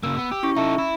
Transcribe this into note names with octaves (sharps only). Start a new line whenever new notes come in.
C#3 A#3 E6
B3
G4
C#4 E4 C#6
D#4 A4 E5
E4